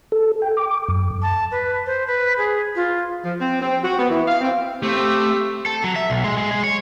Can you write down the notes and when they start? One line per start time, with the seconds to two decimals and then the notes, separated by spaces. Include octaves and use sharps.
0.12 A4
0.42 G5
0.57 D6
0.89 F#2
1.22 A5
1.51 B4
1.86 C5
2.07 B4
2.38 G#4
2.75 F4
3.24 F3
3.39 C4
3.61 C4
3.84 F#4
3.98 B3
4.10 E3
4.27 F5
4.41 C4
4.83 A3 C4 G4
5.66 A4
5.84 F#3
5.96 E5
6.10 B1
6.24 G#3
6.37 G#3
6.51 G#3
6.64 C#5